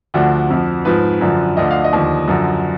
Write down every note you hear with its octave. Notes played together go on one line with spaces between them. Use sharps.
D2 D3 F3 F#4
F2 F3
G#2 F3 B4
F#2 D3 F3
D2 D3 F3 D#5
F5
D#5
D#2 D3 F3
F#2 D3 F3